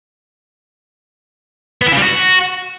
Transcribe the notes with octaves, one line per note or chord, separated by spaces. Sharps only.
B3
E4
C#3
G3
F#4